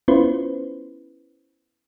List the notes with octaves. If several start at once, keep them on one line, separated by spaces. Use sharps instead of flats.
B3 C#4 E4 F4 B4 C5